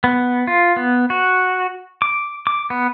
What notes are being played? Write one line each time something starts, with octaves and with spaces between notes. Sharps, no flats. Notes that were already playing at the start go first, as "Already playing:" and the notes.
B3
F4
B3
F#4
D6
D6
B3